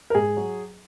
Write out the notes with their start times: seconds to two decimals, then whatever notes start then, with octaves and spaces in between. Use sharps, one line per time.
0.10 A#4
0.15 G#2 G#4
0.37 F#3